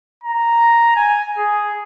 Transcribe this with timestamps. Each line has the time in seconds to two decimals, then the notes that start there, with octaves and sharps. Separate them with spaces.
0.24 A#5
0.96 G#5
1.38 G#4